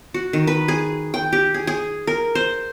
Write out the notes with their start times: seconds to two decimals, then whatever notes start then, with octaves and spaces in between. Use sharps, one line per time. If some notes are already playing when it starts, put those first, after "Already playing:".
0.14 F#4
0.33 D#3
0.47 B4
0.68 G#4
1.14 G5
1.33 G4
1.54 G#4
1.67 G#4
2.07 A#4
2.35 C5